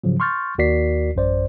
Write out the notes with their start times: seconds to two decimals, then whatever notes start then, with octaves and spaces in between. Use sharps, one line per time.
0.04 G#2 C#3 F3 F#3
0.20 C6 C#6 F6 G6 A6
0.58 D#2 F#4 A#4 D5 B6 C7
1.15 A1 F#2 C5 D5